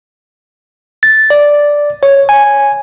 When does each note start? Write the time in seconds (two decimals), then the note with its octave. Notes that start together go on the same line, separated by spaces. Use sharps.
1.03 A6
1.30 D5
2.03 C#5
2.29 G#5